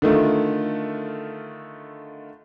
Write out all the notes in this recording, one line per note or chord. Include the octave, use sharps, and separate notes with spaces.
D3 D#3 A3 F4